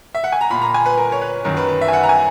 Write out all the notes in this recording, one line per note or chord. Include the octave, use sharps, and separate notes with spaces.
E5
F#5
G#5
A#5
A#2 B5
A#5
G#5
B4
A#4
C#5
B4
F#2 D#3 A#4
B4
B4
E5
G#5
F#5
A#5
G#5